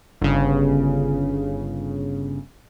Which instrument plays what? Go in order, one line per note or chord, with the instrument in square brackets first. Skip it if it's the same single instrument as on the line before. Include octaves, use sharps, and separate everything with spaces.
[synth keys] G1 C#3